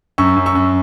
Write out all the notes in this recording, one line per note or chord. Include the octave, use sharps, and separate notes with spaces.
F#2 C#6 E6
F#2
C#6 E6
F#2